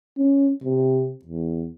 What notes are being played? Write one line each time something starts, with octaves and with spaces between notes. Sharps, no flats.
C#4
C3
E2